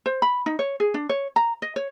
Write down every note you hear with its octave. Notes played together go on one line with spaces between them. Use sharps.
C5
B5
D#4
C#5
G#4
D4
C#5
A#5
D#5
C#5